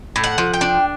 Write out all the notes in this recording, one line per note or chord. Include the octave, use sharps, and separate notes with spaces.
A2
F#5
F3
G5
D4